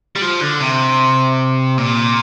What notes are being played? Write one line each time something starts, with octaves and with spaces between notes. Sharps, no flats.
G3
F3
D3
C3
A#2